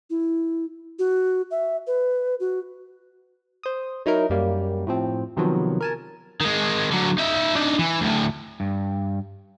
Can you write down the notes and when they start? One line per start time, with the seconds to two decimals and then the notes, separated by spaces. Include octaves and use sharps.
0.10 E4
0.99 F#4
1.51 E5
1.87 B4
2.40 F#4
3.63 C5 D#6
4.06 F#3 D#4 E4 A#4
4.30 F#2 G3 A#3
4.87 A2 F3 C4
5.36 C3 D#3 F3 F#3 B3
5.81 A#4 G#5 A5
6.41 D#3 G#3
6.91 D3 F#3
7.18 D#4 E5
7.55 D4 D#4
7.79 E3
8.01 D2 A2
8.60 G2